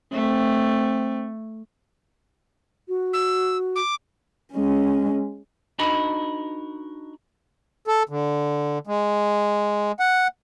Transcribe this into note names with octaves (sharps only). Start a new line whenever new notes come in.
A3 C4
F#4
E6
D6
G#3 C#4
D4 D#4 F#4 A#4 D#5 B5
A4
D3
G#3
F#5